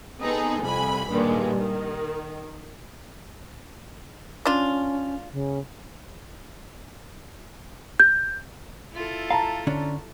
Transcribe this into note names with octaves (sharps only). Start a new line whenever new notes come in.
B3 C4 D#4 G#4 A4 B4
C2 F2 G3 G#5 B5
G2 A#2 D#3 G3 G#3
D#3
C#4 D4 F4
C#3
G6
E4 F4 A4
F5 A5 A#5
D3 C#4 D4